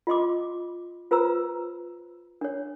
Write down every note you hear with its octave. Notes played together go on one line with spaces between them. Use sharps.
F4 D#5 C6 D6
F4 B4 C5 A#5 E6
D4 C#5